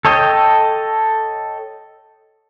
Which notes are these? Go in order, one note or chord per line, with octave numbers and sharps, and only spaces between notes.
A4 C#5 D#5 G5